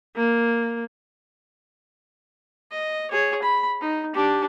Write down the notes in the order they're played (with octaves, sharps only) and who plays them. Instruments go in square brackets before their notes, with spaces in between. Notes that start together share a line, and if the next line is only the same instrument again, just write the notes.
[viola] A#3
[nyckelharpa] D#5
G#4 C#5
B5
D#4
D4 G4